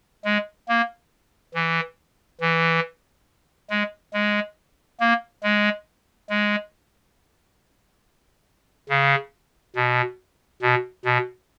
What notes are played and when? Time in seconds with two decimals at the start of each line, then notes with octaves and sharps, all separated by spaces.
0.25 G#3
0.68 A#3
1.54 E3
2.41 E3
3.70 G#3
4.14 G#3
5.00 A#3
5.43 G#3
6.30 G#3
8.89 C#3
9.76 B2
10.62 B2
11.05 B2